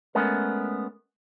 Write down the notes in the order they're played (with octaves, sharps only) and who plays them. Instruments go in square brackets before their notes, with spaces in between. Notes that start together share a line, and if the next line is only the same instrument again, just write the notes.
[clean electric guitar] G#3 A3 B3 C#4 A#4